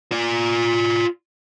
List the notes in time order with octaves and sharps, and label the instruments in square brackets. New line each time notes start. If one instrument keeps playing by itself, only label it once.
[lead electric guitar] F4 D5